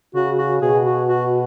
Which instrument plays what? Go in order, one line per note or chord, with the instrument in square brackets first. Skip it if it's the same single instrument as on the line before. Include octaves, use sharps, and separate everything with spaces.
[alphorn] C#3 [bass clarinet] F#4
[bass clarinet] F#4
[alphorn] B2 [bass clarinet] G#4
[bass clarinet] F#4
F#4